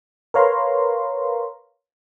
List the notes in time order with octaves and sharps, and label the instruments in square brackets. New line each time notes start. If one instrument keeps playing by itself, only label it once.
[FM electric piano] A#4 B4 C#5 F5 A#5 C6